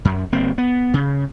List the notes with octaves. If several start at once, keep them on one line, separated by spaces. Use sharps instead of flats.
F#2
G1 A#3 C4
B3
C#3